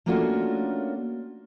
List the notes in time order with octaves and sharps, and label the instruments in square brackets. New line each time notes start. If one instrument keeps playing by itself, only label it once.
[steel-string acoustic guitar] A3 A#3 C#4 D4 F4 F#4